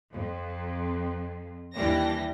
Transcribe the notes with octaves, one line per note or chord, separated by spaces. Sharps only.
F2
D#2 E3 G3 D4 G4 A#6